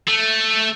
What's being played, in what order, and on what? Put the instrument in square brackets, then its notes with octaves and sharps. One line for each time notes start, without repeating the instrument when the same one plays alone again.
[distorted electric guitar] A3